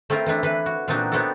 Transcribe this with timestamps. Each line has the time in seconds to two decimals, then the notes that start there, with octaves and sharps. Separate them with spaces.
0.10 A3 C4 E4 F4 A#4
0.26 E3 A3 D4 E4
0.43 E3 B4
0.66 F#4
0.88 A#2 E3 C4 D4 D#4 F#4
1.12 B3 C4 D4 D#4 F#4 A4